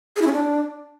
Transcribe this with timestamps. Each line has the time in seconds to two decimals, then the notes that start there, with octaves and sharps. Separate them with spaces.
0.16 G#4
0.21 E4
0.27 C#4
0.32 D4